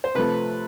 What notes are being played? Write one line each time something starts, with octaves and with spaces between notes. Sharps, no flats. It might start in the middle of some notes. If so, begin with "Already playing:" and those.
C5
C3 F3 A3 B4